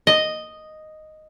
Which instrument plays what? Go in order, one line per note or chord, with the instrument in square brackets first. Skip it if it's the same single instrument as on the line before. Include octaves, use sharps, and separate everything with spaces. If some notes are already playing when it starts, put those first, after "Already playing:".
[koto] D#5